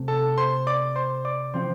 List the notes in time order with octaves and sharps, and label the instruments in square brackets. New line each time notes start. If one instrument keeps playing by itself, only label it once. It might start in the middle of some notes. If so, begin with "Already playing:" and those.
Already playing: [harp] C3 A3
[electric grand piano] A4 A5
C5 C6
D5 D6
C5 C6
D5 D6
[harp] F3 C4 F4 [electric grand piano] C5 C6